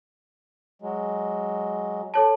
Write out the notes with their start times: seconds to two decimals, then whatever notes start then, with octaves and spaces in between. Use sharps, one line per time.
0.82 F#3 G#3
2.14 A4 C#5 A5